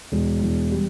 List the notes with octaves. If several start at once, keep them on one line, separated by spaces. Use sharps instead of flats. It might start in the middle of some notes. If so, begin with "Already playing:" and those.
E1
E2
G3